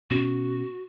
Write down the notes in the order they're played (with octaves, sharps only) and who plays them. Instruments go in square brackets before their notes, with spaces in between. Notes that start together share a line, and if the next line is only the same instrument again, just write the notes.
[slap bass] B2 C#4 [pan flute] F#4